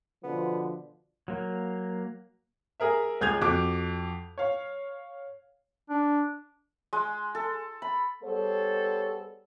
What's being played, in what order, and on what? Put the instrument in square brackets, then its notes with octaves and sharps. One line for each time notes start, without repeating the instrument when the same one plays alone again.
[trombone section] B2 D3 F3 [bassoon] B3
[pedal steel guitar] F#3 A#3
[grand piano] G#4 A#4 E5
C#2 G#4 G6 G#6 F7
F2 F#4 D6
C#5 F5
[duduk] D4
[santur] G#3
A4
B5
[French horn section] G3 B3 G#4 A4 C5 C#5